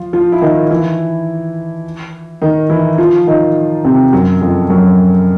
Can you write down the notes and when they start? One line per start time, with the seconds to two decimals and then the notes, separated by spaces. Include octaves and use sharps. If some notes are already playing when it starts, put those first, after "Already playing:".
Already playing: F3 F4
0.13 F3 F4
0.32 E4
0.42 D#3 D#4
0.70 E3 E4
2.42 D#3 D#4
2.70 E3 E4
2.98 F3 F4
3.27 D#3 D#4
3.84 C3 C4
4.13 F#2 F#3
4.41 F2 F3
4.70 F#2 F#3